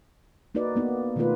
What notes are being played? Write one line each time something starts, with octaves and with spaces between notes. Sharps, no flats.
A#3 D#4 F#4 B4 D5
A#3 B3 D#4
B2 D#3 A3 A#3 F4 B4